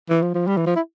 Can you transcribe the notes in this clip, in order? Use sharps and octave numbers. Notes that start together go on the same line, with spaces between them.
E3
F3
F3
G3
E3
F3
E4